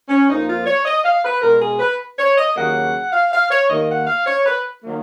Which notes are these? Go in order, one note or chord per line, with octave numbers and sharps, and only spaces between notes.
C#4
F2 F3 A#3 D#4
F4
C#5
D#5
F5
B4
B2 G#3 A#4
G#4
B4
C#5
D#5
D#2 C#3 F#3 A#3 F#5
F5
F5
C#5
D#2 D#3 A#3 D#5
F#5
F5
C#5
B4
D#3 F#3 A#3